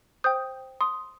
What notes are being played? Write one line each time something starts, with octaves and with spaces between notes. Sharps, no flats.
C5 G5 D#6 G6
C6 D#6